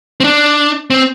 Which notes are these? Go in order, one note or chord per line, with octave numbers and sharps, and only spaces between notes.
C4
D4
C4